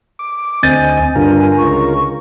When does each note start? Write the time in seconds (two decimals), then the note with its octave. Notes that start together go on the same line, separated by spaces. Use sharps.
0.19 D6
0.63 D2 C4 D#5 G#5 G6 A6 D#7
1.15 G2 D3 F4 A#4 G#5
1.58 C#2 C#6